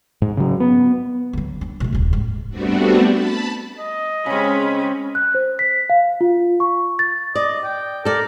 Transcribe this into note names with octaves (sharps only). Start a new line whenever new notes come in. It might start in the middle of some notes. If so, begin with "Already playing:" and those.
G#2
C#3 F#3
B3
D3 F#3
D4
B2 A3
D#1 C2
G#2
G3 A3 B3 C4 D4 F#4
A5 B5
D#5
C#3 G#3 C4 C#4 B5
F#6
C5
B6
F5
F4
C#6
A6
D5 D#5
G5
A4 A#4 D5